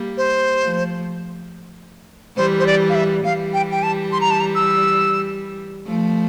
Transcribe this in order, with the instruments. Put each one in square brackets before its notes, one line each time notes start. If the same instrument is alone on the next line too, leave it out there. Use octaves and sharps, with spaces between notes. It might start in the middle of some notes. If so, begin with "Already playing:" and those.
Already playing: [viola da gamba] G3 A#3
[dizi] C5
[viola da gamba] F3 A3
[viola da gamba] E3 G3 [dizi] C5
[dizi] C5
D5
F5
E5
[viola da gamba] E3 G3 [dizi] F5
[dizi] G5
G5
A5
C6
A#5
A5
A#5
E6
[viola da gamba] F3 A3